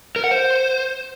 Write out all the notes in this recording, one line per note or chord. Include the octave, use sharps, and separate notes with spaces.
A#4
F#5
C5